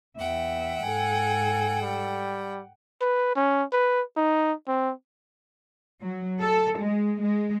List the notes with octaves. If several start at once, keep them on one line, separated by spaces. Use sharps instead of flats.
E2 E5 F#5 G5
G#2 A4 G#5
G3
B4
C#4
B4
D#4
C4
F#3
A4
G#3
G#3